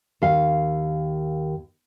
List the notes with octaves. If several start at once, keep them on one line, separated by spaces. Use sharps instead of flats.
D#2 F5